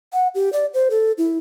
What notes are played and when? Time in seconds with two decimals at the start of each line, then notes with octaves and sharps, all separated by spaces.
0.13 F#5
0.35 G4
0.53 D5
0.74 C5
0.90 A4
1.18 E4